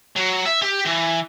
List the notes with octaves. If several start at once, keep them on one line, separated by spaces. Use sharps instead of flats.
F#3
E5
G4
E3